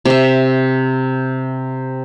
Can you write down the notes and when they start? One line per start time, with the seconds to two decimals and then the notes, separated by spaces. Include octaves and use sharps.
0.05 C3 E5